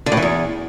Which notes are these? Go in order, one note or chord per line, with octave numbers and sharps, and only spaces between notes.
D3
A2
E3
E2